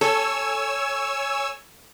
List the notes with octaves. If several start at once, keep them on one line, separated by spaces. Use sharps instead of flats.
A4 C#5 G#5 E6